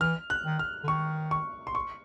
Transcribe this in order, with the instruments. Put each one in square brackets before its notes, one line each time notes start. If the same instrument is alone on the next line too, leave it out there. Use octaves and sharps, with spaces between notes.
[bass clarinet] E3 [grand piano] F6
[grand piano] F#6
[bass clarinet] D#3
[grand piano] F6
[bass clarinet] D3
[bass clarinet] D#3 [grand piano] C#6
[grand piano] C#6
C6
C#6